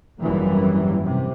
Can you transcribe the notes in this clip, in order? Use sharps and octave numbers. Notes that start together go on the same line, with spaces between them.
G#1 F#2 E3 G3 A#3
C3